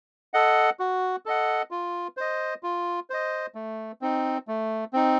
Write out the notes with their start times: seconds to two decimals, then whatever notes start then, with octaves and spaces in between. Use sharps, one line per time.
0.34 A4 D#5 F#5
0.79 F#4
1.26 A4 D#5 F#5
1.71 F4
2.17 C5 D#5
2.63 F4
3.10 C5 D#5
3.55 A3
4.01 C4 D#4
4.48 A3
4.93 C4 D#4